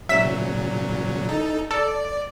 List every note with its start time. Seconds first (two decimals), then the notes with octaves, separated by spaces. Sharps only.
0.09 A#2 C#3 F#3 E5 B6 E7
1.29 D#4 A4
1.71 A4 D5